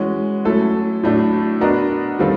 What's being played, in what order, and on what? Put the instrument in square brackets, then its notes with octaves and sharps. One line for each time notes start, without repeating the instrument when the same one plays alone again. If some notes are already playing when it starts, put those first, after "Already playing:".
Already playing: [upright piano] E3 G#3 C#4 F#4
F#3 A3 C#4 E4 A4
A2 F#3 A3 D4
B3 D4 F#4 A#4 D#5
D#3 G3 C4 F4 A4